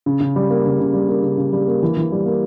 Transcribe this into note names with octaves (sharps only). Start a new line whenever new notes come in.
C#3
C#3
G3
A#3
C#3
C#3
G3
A#3
C#3
C#3
G3
A#3
E3
E3
G3
A#3